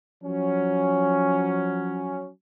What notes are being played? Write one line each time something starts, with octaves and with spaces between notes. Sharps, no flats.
F3 F#3 C#4